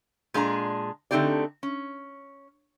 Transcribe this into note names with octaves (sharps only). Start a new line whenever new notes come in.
A#2 G#3 D4 G#4 A#5
D3 A3 C4 D#4 G4 D5
C#4